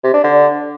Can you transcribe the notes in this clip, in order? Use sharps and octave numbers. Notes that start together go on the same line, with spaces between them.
C3
D4
D3